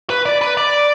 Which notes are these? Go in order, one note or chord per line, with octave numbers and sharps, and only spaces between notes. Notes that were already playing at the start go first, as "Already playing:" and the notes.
B4
D5
B4
D5